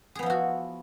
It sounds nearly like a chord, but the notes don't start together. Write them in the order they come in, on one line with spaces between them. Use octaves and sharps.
G#4 B3 F3 E4 F#4